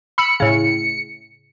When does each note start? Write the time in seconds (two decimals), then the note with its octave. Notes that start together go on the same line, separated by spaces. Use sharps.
0.18 B5 E6 C#7
0.40 A2 C#3